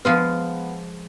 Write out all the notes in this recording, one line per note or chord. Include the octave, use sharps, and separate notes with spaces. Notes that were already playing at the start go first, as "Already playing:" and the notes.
F3 G#3 B3 F4